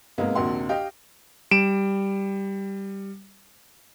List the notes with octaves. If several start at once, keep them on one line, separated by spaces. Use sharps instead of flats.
G#2 C3 G#3 A#3 B3
A#1 D#2 C3 F#4 F#5 C6
G4 D#5 F5 G5
G3 D7 E7